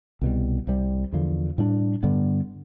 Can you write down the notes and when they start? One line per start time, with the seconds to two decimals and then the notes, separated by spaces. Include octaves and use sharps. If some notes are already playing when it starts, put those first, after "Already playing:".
0.21 C2 B2 G3
0.67 C2 C3 G3
1.12 E2 D3 F3
1.58 A2 G3 D4
2.03 G2 D3 G3 B3